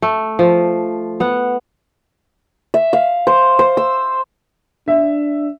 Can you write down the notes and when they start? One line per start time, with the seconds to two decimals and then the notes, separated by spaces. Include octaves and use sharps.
0.02 A3
0.39 F3
1.20 B3 F#5
2.74 E5
2.93 F5
3.27 C5
3.59 C5
3.77 E6
4.88 D4 E5